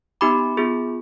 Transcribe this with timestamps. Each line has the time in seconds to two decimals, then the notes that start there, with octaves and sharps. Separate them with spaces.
0.21 B3 D#4 G4 B5 D6
0.57 B3 F4 G#4